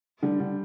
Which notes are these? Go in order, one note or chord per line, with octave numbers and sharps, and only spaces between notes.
D3 G3
D3 G3